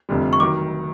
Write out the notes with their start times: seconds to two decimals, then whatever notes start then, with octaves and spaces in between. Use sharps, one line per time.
0.09 F1 F2 D3 G3
0.33 C#6
0.40 D#3 F#3 D6